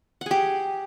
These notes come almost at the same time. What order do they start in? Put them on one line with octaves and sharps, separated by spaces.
F#5 G#4 G4